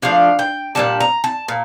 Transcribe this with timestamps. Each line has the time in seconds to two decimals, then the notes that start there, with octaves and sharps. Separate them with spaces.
0.02 F3 A3 D4 F5
0.39 G5
0.75 A#2 G3 D4 A5
1.00 A#5
1.24 A5
1.48 A#2